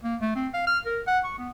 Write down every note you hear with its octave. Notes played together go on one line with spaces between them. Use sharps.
A#3
A3
C4
F5
F6
A#4
F#5
C#6
B3